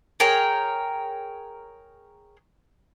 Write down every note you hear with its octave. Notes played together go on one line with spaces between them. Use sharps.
G#4 A#4 C#5 G5